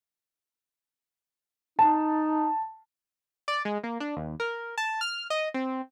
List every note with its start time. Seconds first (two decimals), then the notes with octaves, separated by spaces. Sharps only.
1.79 D#4 A5
3.48 D5
3.65 G#3
3.84 A#3
4.00 D4
4.16 D#2
4.40 A#4
4.78 A5
5.01 F6
5.30 D#5
5.54 C4